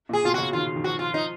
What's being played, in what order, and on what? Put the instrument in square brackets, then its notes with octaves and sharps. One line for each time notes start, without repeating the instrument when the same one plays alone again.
[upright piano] A#2
[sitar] G#4
[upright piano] B2 [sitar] F4
[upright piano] C#3 [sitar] F#4
[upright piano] D#3 [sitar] F4
[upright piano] D#3
[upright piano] F3 [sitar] F#4
[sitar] F4
[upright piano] F3 [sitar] D#4